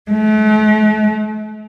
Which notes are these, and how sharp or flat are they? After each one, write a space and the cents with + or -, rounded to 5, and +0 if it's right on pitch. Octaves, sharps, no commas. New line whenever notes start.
A3 -40